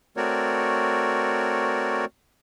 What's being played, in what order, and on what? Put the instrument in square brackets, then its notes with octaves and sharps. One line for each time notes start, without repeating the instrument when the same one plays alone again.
[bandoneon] A3 C4 F#4 A#4 C#5 D5